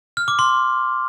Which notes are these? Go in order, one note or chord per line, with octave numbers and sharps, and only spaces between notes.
F6
D6
C6